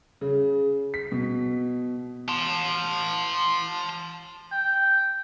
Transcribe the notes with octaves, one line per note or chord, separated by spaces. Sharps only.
C#3
B6
B2
A5 C6
G5